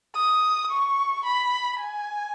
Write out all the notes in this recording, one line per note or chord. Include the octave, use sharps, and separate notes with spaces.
D#6
C#6
B5
G#5